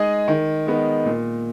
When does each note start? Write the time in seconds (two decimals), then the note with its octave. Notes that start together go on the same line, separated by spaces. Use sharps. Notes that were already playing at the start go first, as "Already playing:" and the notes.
Already playing: G#3 D#4 G#4 D#5
0.28 D#3
0.67 G#3 B3 D#4
1.06 A#2